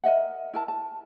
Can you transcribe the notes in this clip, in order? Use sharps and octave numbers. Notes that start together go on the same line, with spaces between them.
A#4 D#5 E5 F#5
E4 A#4 A5
A5